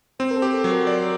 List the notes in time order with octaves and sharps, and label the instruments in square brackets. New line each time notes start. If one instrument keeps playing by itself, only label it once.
[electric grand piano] C4 [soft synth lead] C5
[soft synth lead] A#4
A4
[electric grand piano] G4
[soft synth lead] A4
[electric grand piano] F#3
[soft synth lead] A#4
[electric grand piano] D5